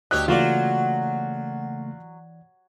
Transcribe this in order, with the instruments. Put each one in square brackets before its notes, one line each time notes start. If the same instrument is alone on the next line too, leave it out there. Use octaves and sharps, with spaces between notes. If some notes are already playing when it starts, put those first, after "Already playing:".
[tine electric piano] D2 F#4 E6 [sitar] G2 G4 C#5 [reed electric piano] D#5 [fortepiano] F#6
[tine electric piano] C#3 A3 A#3 [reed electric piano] E3 D5 [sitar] F#3 [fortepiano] F4 F#4